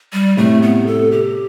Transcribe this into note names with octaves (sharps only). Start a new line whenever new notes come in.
G3
A2 C3 A3
B3
A4
G4